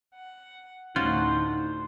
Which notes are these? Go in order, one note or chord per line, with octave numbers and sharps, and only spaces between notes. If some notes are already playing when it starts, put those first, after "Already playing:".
F#5
D2 A2 C#4 D#4 F4 F#4 C5 F#5